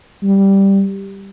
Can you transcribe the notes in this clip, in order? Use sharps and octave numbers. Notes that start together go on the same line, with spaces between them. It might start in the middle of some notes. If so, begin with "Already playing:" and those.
G3